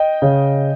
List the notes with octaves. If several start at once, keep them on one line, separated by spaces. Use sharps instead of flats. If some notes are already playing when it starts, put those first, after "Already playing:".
Already playing: D#5 G5
C#3